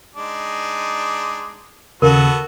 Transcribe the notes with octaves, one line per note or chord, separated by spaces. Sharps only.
G#3 D4 D#4
D#2 C#3 B3 F#4 A4 A#4